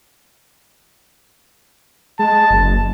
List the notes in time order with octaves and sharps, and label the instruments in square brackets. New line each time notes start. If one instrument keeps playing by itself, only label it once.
[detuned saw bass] G#3 [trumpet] A5
[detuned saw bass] F#1